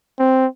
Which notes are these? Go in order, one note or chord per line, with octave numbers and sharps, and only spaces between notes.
C4